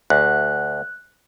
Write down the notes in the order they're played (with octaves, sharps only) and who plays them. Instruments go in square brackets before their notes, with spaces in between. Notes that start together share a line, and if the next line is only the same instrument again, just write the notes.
[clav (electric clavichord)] D2 [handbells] F#6